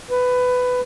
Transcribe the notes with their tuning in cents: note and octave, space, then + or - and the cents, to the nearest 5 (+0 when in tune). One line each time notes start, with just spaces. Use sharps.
B4 +15